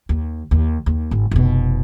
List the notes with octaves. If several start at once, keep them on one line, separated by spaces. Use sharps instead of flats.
D#2
D#2
D#2
G#1
F1 B2